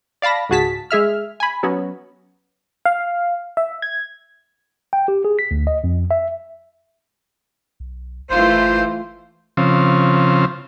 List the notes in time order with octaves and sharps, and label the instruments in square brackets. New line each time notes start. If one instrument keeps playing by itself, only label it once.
[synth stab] D5 F5 A5 B5 A#6
G#1 C#2 F#4 G#4 A5 B6
G#3 G#4 E5 F6
G#5 B5
F#3 B3 C#4 F#4
[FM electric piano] F5
E5
G#6
[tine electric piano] G5
G4
G#4
B6
D2
D#5
F2
E5
[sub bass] B1
[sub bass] G1 [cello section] E3 A3 F4 [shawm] C5
[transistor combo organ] C#3 F3 C4